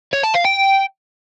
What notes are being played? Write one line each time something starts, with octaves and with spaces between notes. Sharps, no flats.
C#5
A5
F5
G5